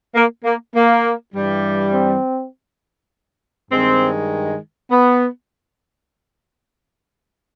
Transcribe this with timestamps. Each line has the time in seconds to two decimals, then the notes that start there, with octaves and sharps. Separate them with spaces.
0.15 A#3
0.45 A#3
0.75 A#3
1.34 G2 E3 G3
1.93 C4
3.71 G2 D#3 G#3 C4
4.91 B3